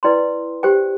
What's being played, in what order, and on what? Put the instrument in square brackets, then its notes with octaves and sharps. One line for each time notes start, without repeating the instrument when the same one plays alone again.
[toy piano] E4 B4 D5 G5 C6
G4 C5 G5